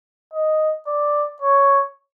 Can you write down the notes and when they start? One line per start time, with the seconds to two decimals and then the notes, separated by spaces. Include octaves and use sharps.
0.34 D#5
0.87 D5
1.42 C#5